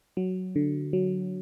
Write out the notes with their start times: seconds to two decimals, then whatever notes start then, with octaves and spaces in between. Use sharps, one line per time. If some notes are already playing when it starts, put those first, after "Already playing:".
0.17 F#3
0.56 D3
0.93 F#3